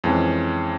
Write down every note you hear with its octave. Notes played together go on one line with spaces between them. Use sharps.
F2 E3 G#3 C#4